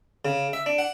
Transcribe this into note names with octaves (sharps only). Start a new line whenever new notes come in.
C#3
E5
D4
F#5